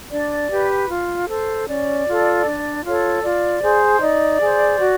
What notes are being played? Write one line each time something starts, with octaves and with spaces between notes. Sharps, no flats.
D4 D5
G4 B4
F4
A4 C5
C#4 D5
F4 A4
D4
F4 A4 C#5
F4 D5
G#4 C5
D#4 D5
G#4 C5
F#4